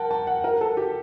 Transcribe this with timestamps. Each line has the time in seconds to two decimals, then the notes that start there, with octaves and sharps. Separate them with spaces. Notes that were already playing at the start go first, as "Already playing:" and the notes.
Already playing: A#4 F#5 G5 A5
0.11 A5
0.27 F#5
0.44 A#4
0.61 A4
0.77 G4